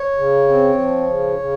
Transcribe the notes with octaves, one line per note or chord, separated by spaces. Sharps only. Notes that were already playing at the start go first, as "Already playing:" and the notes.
Already playing: C#5
C#3
C4
F3
C#3
C#3